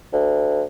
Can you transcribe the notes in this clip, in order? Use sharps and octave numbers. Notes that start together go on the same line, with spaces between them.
D2